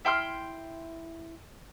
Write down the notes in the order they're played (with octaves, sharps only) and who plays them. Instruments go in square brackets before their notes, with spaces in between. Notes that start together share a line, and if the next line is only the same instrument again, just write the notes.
[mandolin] E4 G5 C6 F6